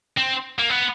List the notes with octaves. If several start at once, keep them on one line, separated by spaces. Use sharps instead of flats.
C4
A#3
B3